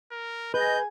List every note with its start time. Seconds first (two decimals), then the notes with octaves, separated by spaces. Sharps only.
0.11 A#4
0.54 G#4 B4 D#5 G#5 G6